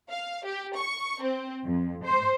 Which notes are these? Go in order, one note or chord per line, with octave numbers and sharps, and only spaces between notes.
F5
G4
C#6
C4
F2
C5